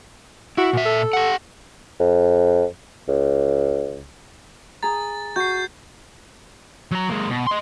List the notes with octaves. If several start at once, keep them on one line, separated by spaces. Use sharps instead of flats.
E4 F#4
A#2 E5
A4
G4 F#5
F2
C#2
G#4 A#5 A6
F#4 G6 C7
F#3 A#5
G#3 A#3
B2
D#5 C6